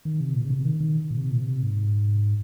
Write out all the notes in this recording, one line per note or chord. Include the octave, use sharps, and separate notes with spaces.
D#3
C3
A#2
C#3
C3
D#3
D#3
A#2
C3
A#2
C3
G#2